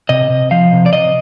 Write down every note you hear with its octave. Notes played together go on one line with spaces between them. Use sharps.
C3 D#5
C3
F3 F5
C3
D5
C3 D#5